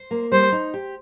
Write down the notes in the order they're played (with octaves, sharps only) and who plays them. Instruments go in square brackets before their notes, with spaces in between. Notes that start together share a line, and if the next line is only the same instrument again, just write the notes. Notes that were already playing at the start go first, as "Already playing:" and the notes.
Already playing: [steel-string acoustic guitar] C5
A#3
[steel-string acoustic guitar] G3 [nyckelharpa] C5
[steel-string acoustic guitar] D#4
G4